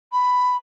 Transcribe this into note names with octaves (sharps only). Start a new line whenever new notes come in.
B5